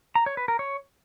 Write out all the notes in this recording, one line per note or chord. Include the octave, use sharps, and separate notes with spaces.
A#5
C#5
B4
A#4
C#5